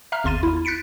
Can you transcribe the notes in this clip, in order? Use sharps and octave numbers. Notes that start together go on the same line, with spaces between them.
E5 F5 A#5 F6
G#1 E2 C6 A6 D#7
E4
F#6 A6 B6 C#7 D7